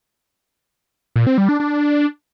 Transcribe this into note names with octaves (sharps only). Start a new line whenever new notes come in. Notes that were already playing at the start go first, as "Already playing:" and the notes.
A#2
C4
G3
D4
D4